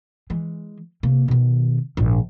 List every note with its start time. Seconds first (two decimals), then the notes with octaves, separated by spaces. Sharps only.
0.30 E3 G#3
1.03 C3 A#3
1.28 B2 D#3
1.97 A#1 G#2